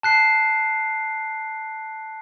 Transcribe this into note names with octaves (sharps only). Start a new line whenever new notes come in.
A5 F#6 C7